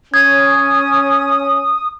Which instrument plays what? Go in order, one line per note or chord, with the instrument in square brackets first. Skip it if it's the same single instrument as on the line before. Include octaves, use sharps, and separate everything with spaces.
[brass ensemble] C#4 [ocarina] D#6 [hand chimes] G#6